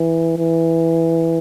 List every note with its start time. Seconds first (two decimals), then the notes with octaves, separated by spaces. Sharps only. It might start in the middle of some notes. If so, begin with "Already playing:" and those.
Already playing: E3
0.37 E3